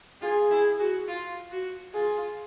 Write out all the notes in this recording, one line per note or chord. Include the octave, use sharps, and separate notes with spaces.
F4 G#4
E4
F#4
F4
F#4
F4 G#4